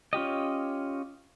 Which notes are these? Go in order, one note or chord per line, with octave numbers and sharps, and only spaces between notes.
C#4 F4 G4 D#5